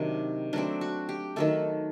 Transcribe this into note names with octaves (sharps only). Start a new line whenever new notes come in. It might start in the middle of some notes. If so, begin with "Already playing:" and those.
Already playing: C3 D#3 F#3 D4
F#3 A3 C4 D4
F#4
G4
D#3 F#3 A3 A4